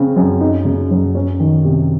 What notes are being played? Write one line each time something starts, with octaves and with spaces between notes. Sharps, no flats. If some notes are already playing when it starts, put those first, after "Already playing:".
Already playing: C#3 C4
F#2
D#4
C#3
F#2
C#4
D#3
C3